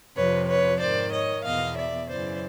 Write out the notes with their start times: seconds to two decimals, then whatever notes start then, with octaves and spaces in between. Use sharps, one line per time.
0.16 F2 C3 F3 B4 C#5
0.48 B4 C#5
0.80 G#2 D#3 C5 D5
1.12 C#5 D#5
1.45 E2 B2 D#5 F5
1.77 D5 E5
2.10 F#2 C#3 E3 C5 D5